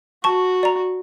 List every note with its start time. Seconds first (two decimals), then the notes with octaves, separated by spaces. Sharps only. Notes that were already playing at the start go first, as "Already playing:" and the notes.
0.24 F#4 A5 C#6
0.63 D5 A#5